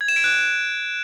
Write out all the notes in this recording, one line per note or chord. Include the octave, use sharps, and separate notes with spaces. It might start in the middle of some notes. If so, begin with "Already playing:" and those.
G#6
E7
D7
F#6